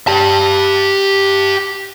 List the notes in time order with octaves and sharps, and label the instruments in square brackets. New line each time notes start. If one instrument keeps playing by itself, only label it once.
[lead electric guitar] G4 A5